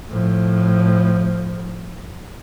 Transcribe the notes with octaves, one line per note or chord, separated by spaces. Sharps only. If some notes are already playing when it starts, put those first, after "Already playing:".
A2 F3